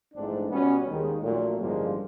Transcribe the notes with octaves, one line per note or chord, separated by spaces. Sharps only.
A#1 G#2 E3 A3 C4 D4
C#2 B2 G3 B3 C#4
D#2 D#3 G#3
A#1 A#2 F#3 A3
A1 G2 D3 F3 G#3 A#3